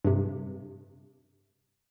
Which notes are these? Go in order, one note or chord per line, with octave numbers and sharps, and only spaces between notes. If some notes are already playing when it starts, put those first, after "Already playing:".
G2 C3